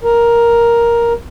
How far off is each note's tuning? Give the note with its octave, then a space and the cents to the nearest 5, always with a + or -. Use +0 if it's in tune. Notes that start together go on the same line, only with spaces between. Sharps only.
A#4 +5